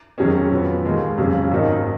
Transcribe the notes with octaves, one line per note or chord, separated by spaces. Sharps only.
F2 D#3 F#3 C#4 G#4
F2 F3 B3
D#2 D#3 G#3
F2 C#3 F#3 C#4
G#1 F#2 D#3 A#3 D#4